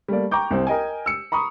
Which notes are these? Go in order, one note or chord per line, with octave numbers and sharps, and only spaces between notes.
G3 A3 A#3 D5
G5 A#5 C#6 D6 G6
C2 C4
A#4 D#5 G5 G#5
E6 C#7
A#5 B5 C#6 D#6